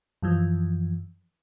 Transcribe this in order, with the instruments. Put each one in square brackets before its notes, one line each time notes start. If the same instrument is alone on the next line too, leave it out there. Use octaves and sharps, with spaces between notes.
[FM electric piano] F#2 E3 F3